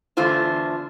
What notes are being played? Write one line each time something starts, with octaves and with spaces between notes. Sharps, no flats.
E2 D3 A3 F4 C5